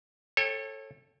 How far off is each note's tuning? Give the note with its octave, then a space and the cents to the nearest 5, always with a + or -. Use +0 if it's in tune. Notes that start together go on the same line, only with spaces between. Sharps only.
A4 +0 C#5 -30 G5 +25